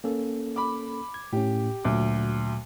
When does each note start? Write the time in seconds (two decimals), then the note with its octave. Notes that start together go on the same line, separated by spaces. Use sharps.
0.04 A#3 C#4 A4
0.56 B5 D6
1.14 G#6
1.33 A2 C#4 G4
1.85 D2 A#2 F#3 D6